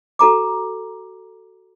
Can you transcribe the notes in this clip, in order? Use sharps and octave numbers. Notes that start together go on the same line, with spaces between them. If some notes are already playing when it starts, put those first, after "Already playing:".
F#4 A4 A#5 D6